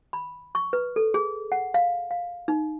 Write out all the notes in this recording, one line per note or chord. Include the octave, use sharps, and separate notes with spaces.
B5
C#6
B4
A4
G#4
F#5
F5
F5
D#4